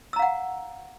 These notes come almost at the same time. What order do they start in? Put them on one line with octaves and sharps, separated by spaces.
E6 A#5 F5 F#5